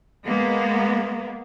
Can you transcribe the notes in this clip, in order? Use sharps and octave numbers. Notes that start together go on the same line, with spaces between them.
G#3 A#3 B3